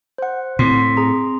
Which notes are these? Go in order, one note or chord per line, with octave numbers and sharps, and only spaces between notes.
C5 F#5
A2 C4 B6
G#4 A#5